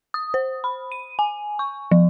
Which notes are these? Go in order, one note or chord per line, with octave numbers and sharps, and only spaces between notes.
D#6
C5
B5
D#7
G#5
C#6
F3